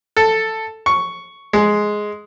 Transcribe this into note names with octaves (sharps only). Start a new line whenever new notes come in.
A4
C#6
G#3